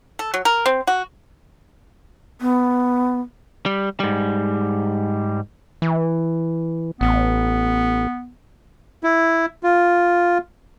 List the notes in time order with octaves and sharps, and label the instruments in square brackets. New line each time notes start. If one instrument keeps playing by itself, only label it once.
[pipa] A4
F#3
A#4
C4
F#4
[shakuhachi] B3
[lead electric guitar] G3
G#2 G3
[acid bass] E3
[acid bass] A1 [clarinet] B3
[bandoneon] E4
F4